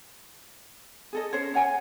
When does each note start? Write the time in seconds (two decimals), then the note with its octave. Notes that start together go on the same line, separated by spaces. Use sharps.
1.13 G#4 A4 D#5
1.33 C#4 C5 C#5
1.54 C#5 F#5 G#5